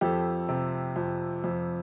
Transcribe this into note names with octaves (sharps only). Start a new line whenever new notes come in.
F2 G4 A4
C3
F2
F2